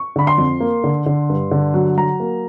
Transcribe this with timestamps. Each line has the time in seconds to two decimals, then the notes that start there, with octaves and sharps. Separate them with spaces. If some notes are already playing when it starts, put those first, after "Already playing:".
Already playing: C#6
0.16 D3 B5
0.27 C6
0.38 F2
0.60 A#3
0.84 D3
1.06 D3
1.29 G2
1.51 D3
1.74 F#3
1.97 F#3 A#5
2.20 A#3